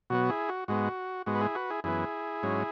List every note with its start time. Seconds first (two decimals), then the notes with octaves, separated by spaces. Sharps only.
0.10 B2 F#3 B3 F#4
0.29 E4 G#4
0.49 F#4
0.68 G#2 G#3 B3 F#4
1.26 G#2 G#3 B3 F#4
1.35 B4
1.41 E4 G#4
1.55 F#4 B4
1.70 E4 G#4
1.84 F#2 E3 B3 E4 G#4
2.43 G#2 F#3 C#4